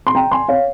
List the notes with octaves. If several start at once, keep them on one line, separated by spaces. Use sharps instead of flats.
C6
G5 A#5
G#5 C6
C#5 F5